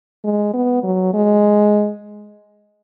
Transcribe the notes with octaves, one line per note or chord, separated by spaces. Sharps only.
G#3
B3
F#3
G#3